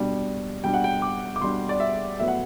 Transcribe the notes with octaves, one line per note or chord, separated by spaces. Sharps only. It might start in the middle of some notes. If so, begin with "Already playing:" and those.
Already playing: B2 G3 D4
B2 G3 D4 G5
F#5
G5
D6
D6
B2 G3 D4 C6
D5
E5
A2 F#3 B3 E5
F#5